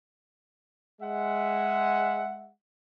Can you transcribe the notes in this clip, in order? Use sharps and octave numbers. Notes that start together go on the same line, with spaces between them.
G#3 E5 F#5